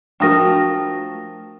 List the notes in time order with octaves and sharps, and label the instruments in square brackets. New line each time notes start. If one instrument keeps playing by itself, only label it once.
[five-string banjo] F3 A3 A#4 [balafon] D4 F#4 [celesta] G5 D#6 A#6